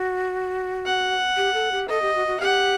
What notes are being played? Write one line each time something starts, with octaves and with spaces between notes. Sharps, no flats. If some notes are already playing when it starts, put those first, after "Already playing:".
Already playing: F#4
F#5
G4
A4
G4
A4 D#5
G4
F#4
F#4
G4 F#5